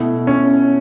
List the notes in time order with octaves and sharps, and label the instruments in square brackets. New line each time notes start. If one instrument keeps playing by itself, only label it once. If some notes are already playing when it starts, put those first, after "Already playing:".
Already playing: [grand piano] B2 A3 E4
[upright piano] C#4